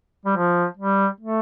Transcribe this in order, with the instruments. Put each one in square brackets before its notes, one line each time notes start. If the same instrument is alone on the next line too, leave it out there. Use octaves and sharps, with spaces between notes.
[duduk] G3
F3
G3
A3